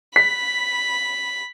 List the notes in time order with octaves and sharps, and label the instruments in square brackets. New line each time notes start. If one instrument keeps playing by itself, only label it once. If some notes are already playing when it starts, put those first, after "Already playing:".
[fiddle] B5 [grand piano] B6